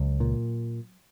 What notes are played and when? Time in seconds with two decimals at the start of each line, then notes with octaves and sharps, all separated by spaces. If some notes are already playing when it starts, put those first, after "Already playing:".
Already playing: C#2 F#3
0.20 A#2